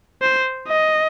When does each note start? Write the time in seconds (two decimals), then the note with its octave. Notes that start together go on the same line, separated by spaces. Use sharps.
0.22 C5
0.68 D#5